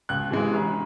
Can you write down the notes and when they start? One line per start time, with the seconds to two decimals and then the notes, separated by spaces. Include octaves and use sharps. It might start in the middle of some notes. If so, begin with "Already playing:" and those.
0.09 C#2 F#6
0.31 C3 E3 G#3
0.53 E1